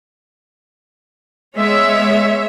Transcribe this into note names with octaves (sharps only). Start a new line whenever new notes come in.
G#3 B3 C#5 E5